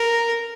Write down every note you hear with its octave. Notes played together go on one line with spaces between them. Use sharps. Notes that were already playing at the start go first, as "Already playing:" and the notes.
Already playing: A#4